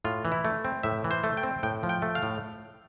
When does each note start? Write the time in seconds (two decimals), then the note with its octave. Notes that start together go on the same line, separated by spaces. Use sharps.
0.04 A2 F4
0.25 E3
0.32 E4
0.45 A3
0.65 C4
0.83 A2 E5
1.04 E3
1.11 C5
1.24 A3
1.37 G5
1.43 C4
1.63 A2 G5
1.83 F3
1.89 G5
2.02 A3
2.15 F5
2.23 A2